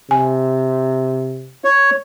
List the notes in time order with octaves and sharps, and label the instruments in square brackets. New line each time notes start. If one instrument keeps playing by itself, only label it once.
[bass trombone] C3 [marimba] G#5
[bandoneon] C#5